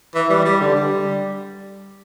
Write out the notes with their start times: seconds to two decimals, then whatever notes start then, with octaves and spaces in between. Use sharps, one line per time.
0.15 E3
0.30 G3
0.45 G3
0.61 D3
0.76 G3